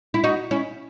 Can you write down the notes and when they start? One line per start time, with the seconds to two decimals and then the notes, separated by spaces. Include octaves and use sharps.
0.14 E4
0.24 D#4 F#4
0.51 C#4 E4